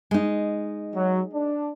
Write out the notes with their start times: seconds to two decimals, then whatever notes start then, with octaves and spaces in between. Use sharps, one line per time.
0.11 G#3 D#4
0.94 F#3
1.32 D4